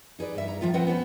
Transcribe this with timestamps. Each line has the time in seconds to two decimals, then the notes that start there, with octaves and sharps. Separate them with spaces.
0.19 D#4 G#4 B4 D5
0.35 G2 E5
0.48 A#5
0.61 A2 F3 C#4 F4 E5
0.74 C4 B4 C5 F#5 G5
0.87 B3 C#4 C5